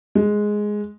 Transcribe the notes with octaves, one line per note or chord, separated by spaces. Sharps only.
G#3